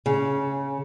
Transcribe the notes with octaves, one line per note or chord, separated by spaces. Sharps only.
C#3